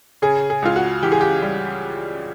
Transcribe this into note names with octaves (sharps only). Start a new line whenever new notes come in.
C#3 G#4
G#4
C#2 F4
F#4
E3 G4
G#4
G4
G3